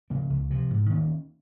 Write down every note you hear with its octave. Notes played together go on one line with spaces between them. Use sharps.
C#3 F3 A#3
C#2
C3 F3
G#2
D#3 A#3 C#4